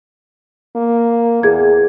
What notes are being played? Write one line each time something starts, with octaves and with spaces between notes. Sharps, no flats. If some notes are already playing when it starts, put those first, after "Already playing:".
A#3
E2 G#4 G#6